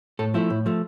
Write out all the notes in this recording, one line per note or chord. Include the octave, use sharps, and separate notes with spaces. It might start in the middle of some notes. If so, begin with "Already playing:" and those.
A2 A4
F3 A3 E4
A2
F3 A3